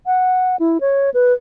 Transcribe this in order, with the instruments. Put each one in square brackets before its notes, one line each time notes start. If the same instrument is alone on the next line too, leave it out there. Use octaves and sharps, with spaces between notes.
[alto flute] F#5
E4
C#5
B4